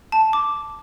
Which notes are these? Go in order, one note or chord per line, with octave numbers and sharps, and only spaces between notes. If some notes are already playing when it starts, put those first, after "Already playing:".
A5
D6